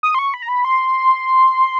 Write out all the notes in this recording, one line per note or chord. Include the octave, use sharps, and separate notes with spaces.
D#6
C6
C#6
B5
A#5
B5
C6